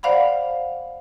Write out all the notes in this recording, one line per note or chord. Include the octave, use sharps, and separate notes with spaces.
C5 D5 F5 F#5 B5